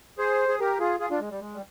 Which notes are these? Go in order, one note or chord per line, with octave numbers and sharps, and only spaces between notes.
G#4 C5
G#4
G4 A#4
F4 G#4
F4 G#4
D4 F4
G#3
G3
G#3
G3